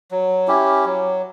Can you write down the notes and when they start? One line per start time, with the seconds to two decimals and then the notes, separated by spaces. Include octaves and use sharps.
0.11 F#3
0.47 C#4 E4 G4
0.85 F#3